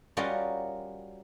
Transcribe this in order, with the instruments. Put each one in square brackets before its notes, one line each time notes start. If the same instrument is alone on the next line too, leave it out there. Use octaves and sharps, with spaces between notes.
[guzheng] G3 C#4 F4 F#4 A#4 D#5